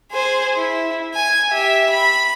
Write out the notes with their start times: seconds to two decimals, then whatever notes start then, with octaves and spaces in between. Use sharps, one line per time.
0.12 G#4 C5
0.56 E4
1.15 G#5
1.49 G4 E5
1.90 B5